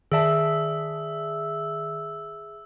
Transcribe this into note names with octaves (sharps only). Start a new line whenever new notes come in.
D#3 G#4 D5 E5 A5 E6